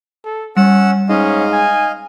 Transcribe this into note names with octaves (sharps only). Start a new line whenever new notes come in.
A4
G3 C#4 F#5 E6
G#2 C#4 D#5 F5
G#5